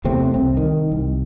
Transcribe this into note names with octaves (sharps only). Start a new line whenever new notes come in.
E2 C3 A3 C4
C2 C4
D#3
C2